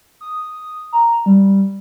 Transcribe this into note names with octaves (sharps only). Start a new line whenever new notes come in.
D#6
A#5
G3